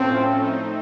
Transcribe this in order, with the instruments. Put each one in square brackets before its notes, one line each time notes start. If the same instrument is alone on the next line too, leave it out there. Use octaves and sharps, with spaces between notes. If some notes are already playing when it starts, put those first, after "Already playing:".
Already playing: [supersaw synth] A2 F3 A3 C#4 A4 [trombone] C4
[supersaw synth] A3 C4 D#4